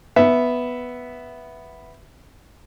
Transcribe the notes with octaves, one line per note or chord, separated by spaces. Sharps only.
B3 E5